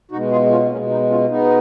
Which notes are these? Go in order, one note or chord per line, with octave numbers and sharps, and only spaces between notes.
B2 G#3 D#4 F#4
F4 G#4
C#4 F4
B2 G#3 A#3 C#4
B3 D#4
C#4 F4
B2 G#3 B3 D#4